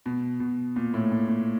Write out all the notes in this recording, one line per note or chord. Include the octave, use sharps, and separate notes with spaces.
B2
B2
A#2
A2
A#2
A#2